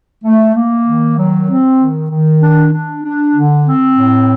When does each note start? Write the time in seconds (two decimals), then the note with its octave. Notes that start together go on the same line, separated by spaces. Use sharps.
0.24 A3
0.55 A#3
0.87 D#3
1.17 F#3
1.49 C4
1.80 D#3
2.11 D#3
2.42 D4
2.73 D4
3.04 D4
3.35 D3
3.67 C4
3.97 A2